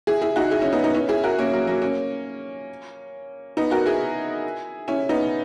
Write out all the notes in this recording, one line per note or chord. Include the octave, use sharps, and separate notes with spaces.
E4 G#4
E4 G#4
D#4 F#4
E4 G#4
C#4 E4
B3 D#4
B3 D#4
C#4 E4
E4 G#4
F#4 A#4
A#3 C#4
F#3 A#3
F#3 A#3
A#3 C#4
B3 D#4
F#4 A#4
E4 G#4
C#4 E4
B3 D#4